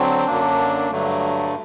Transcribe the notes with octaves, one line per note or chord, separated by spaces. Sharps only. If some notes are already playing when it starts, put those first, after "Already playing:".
Already playing: D3 F#3 C4
F#2 D3 F#3 A#3 D4
G2 D3 F#3 A3